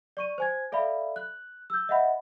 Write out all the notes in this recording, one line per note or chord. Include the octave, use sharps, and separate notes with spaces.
D5 C#6 D#7
C5 G#5 G#6
A4 D5 E5 F5 B5
F#6
E6 G6
D#5 E5 F#5 B5